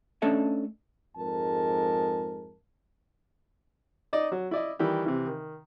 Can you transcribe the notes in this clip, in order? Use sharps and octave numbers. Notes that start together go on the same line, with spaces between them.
A3 C#4 D4 A4 D#5 E5
F2 G#2 G#3 A#4 A5
D#4 D5 D#5
F#3
E4 D5 D#5
D#3 E3 G3 G4
C3 E3
D#3